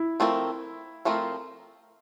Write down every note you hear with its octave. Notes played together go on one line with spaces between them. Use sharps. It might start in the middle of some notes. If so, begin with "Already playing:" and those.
Already playing: E4
F3 A3 C4 F4 A#4
F3 A3 C4 F4 A#4